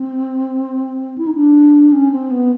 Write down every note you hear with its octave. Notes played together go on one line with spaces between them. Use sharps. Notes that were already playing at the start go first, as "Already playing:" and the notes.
Already playing: C4
E4
D#4
D4
C#4
C4
B3